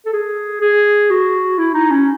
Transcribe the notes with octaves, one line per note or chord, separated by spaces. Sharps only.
A4
G#4
G#4
F#4
E4
D#4
C#4